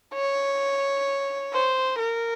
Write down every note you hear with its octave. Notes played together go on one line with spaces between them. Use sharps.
C#5
C5
A#4